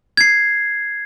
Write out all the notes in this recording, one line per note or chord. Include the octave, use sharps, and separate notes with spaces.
G#6 C7